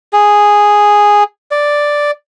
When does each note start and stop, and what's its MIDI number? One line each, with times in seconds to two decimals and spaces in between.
0.13 1.24 68
1.51 2.11 74